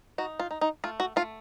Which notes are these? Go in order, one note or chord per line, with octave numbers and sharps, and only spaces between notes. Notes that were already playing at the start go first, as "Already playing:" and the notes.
D#4 F#4
F4
D#4
D#4
A3 F4
F#4
A3 F4